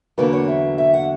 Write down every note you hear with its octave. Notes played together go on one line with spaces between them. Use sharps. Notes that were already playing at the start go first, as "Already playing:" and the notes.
E2 D3 F#3 A#3 D4 B4
C#5
E5
E5
F#5